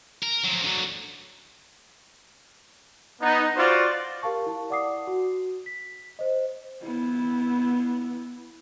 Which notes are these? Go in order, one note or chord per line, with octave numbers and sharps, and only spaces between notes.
A#4
F3 F#3
D3 F#3
B3 D#4
F4 F#4 C5 D5
G4 A#4 F5 A5 C#6
E4 A5
D5 F#5 D6 D#6 C7
F#4
B6
C5 D#5
B3 E4